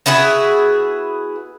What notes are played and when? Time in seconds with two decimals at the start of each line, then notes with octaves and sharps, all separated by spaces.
0.06 B3 E4 F#4 G#4